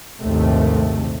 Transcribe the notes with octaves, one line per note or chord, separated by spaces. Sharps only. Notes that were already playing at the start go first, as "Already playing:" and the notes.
A#1 D#2 G#2 C3 A3